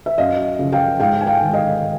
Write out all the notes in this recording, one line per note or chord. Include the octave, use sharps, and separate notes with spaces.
E5
F#2 D#5 F5
C#3 F3
F5 G5
G#2 F5 G5
G#5
F5 G5
D#3 G#3
D#5 F5